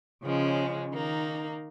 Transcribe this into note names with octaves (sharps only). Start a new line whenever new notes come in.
C#3 F3 G#3 C#4
D#3 A#3 D#4